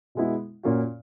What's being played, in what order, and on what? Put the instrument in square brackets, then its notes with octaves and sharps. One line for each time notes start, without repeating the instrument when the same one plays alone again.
[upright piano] B2 G#3 B3 E4
A#2 A#3 C#4 F#4